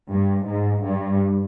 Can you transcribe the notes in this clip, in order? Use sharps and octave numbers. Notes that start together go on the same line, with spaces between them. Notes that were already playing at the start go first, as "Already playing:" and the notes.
G2
G#2
G2